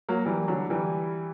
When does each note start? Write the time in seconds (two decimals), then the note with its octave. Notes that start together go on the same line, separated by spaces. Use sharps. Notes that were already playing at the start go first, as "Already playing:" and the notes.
0.09 F#3 A#3
0.25 E3 G3
0.48 D3 F#3
0.70 E3 G3